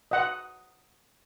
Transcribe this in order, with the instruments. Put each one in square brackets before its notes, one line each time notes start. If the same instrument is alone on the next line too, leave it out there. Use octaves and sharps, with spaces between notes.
[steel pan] D#5 F#5